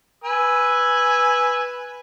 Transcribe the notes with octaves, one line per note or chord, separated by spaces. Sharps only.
B4 G#5 E6